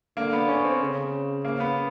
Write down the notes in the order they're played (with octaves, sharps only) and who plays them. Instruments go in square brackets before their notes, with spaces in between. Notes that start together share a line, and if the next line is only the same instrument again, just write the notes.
[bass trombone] D3 [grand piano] A#3
[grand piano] B3
C#4
C4
[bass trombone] C#3
[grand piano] A#3
B3